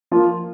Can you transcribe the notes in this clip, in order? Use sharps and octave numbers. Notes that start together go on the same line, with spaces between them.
F3 A#3 F4